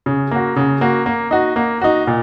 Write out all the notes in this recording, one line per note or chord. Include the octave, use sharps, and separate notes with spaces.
C#3
A#3 F#4
C#3
A#3 F#4
A#3
D#4 F#4
A#3
D#4 F#4
A#2